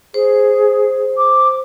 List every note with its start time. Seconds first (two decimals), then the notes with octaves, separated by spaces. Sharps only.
0.14 G#4 C5
1.17 D6